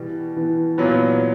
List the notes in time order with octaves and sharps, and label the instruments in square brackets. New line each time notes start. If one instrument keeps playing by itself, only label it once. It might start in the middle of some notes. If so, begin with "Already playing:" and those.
Already playing: [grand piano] B2 G3 [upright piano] E3
[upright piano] E3
[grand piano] A#2 F#3 B3